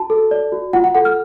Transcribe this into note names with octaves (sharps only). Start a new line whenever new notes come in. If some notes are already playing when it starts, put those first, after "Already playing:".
Already playing: F#4 A5
A4
D5
F#4
F4 F#5
F#5
A4 F#5
F6